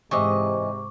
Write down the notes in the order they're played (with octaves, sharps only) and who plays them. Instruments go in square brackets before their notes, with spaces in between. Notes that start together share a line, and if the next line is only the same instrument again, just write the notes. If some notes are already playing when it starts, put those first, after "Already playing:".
[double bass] G#2 [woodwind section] C3 [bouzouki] E3 D#5 [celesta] C#6 D6